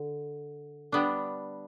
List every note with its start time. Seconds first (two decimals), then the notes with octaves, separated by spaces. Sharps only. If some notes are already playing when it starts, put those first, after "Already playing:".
Already playing: D3
0.92 G3 B3 D4